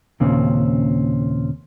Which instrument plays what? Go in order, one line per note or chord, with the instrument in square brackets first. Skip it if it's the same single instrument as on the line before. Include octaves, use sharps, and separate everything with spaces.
[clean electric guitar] D#2 A#2 C#3 C4 C#4